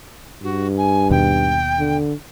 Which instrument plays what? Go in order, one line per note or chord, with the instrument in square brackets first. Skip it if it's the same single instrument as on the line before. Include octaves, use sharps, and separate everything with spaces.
[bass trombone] G2 [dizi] F#4
[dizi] G#5
[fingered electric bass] D#2 B2 [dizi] G5
[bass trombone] D3